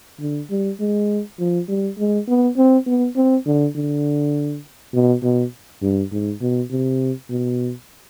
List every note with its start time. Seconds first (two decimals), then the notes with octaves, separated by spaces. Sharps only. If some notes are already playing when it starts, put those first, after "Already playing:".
0.21 D3
0.50 G3
0.80 G#3
1.39 F3
1.69 G3
1.98 G#3
2.28 B3
2.57 C4
2.87 B3
3.16 C4
3.46 D3
3.76 D3
4.94 B2
5.23 B2
5.82 G2
6.12 G#2
6.41 B2
6.71 C3
7.30 B2